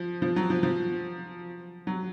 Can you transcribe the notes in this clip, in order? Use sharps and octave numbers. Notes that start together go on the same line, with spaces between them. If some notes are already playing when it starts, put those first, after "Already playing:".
Already playing: F3
F3
F#3
F3
F3
F#3